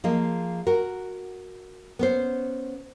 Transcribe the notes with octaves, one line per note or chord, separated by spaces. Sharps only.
F3 A#3 G#4 D#5
F#4 A#4
B3 C#4 C5